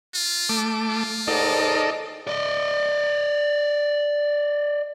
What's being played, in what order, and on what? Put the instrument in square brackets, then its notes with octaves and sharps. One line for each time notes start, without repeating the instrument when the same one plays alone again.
[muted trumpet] F4
[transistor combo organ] A3 D6
[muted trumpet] F4
[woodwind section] D#2 G#2 D#5 [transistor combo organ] D#4 A4 D5
[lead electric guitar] D5 D#5